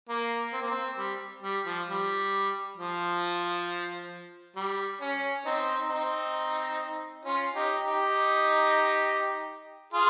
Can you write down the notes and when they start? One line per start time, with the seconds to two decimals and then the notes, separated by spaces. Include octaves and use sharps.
0.09 A#3
0.53 C4
0.62 A#3
0.71 C4
0.98 G3
1.42 G3
1.66 F3
1.88 G3
2.77 F3
4.56 G3
5.01 C#4
5.45 C4 D#4
5.90 C4 D#4
7.25 C#4 F4
7.55 D#4 G4
7.84 D#4 G4
9.93 F4 G#4